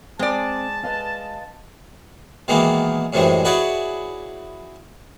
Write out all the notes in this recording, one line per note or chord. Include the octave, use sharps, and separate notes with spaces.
G#3 C4 D5 A5
B4 D#5 F5
B2 D#3 E3 G#3 A#3 B3
F#2 A2 C3 E3 G3 G#3
E4 F#4 G#4 B4 C#5 D5